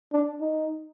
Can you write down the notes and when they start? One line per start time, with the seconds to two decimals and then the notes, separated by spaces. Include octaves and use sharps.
0.13 D4
0.41 D#4